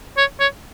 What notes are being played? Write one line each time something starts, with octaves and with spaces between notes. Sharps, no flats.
C#5
C#5